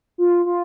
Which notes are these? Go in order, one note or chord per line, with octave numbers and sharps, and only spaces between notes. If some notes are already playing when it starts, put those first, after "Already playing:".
F4
F4